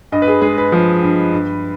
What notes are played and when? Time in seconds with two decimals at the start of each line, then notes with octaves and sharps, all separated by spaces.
0.12 G2 D#5
0.22 B4
0.28 G#4
0.42 G#3 G#4
0.58 B4
0.72 F3
1.02 G2
1.32 G2